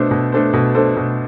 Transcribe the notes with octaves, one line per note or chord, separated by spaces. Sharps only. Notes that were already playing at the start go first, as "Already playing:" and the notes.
Already playing: B2 A3 D4 A4 C5
B2
A3 D4 A4 C5
B2
A3 D4 A4 C5
B2